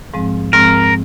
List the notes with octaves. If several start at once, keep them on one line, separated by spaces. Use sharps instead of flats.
G#2 F3 G#3 C4
G#2 F3 G#3 C4 A#4